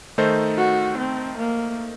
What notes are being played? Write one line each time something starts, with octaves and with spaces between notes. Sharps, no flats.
D#3 A3 D#4 A4 C5
F#4
C4
A#3